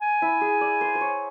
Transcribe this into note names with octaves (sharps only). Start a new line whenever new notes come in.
G#5
E4
G#4
D5
C5
C5
C#5